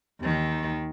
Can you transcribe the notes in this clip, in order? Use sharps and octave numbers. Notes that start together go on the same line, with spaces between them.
D#2 D#3